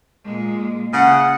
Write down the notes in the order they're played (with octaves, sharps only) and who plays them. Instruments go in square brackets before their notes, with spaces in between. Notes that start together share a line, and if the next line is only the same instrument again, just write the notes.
[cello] A#2 G#3
[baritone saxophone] C#3 [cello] F#5